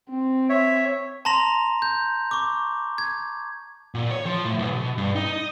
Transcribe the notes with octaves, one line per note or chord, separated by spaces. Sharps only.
C4
C#5 E5
A5 A#5 C6 A#6 F7
G6
C#6 D6
G#6
A#2
C#5
F3
A2
B1
B2
G2
D#4
D#5